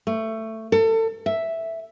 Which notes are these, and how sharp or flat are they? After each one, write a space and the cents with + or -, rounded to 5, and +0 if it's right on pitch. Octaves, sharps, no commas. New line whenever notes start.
A3 +15
A4 +30
E5 +0